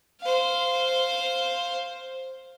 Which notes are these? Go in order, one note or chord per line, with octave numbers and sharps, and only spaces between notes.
C5 F5